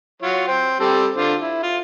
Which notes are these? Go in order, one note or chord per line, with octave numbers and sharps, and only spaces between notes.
F#3 F4 C#5
C5 G5
G3 C4 A4
D3 F4 C5
E4
F4